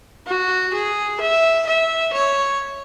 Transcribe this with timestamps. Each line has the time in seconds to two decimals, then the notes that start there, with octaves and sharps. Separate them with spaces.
0.27 F#4
0.74 G#4
1.21 E5
1.67 E5
2.14 C#5